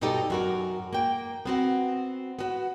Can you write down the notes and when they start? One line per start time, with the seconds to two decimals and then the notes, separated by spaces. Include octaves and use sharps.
0.01 G2 B2 G3 D#4 G4 A4
0.30 F#2 F#4 A#4
0.93 A#3 G5
1.46 B3 C4 F#4
2.39 B3 F#4